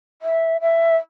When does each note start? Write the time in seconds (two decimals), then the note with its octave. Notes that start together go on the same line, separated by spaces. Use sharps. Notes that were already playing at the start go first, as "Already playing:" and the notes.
0.22 E5
0.61 E5